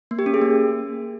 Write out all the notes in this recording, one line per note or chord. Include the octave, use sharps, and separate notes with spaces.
A#3
G4
C#4
G#4
A#3